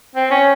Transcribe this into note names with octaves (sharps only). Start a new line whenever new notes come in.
C4
C#4